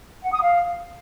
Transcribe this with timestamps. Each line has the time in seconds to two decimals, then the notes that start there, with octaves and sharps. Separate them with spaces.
0.23 F#5
0.32 D#6
0.42 F5